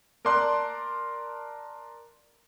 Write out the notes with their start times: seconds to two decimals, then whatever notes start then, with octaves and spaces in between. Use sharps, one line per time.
0.25 A#4 D5 A5 C6 F#6